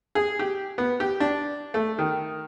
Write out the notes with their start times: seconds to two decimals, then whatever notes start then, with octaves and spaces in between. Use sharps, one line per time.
0.15 G#4
0.39 G4
0.78 B3
1.00 G4
1.20 D4
1.74 A3
1.99 D#3